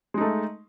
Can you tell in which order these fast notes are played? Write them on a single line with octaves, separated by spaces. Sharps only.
G#3 D#4 A3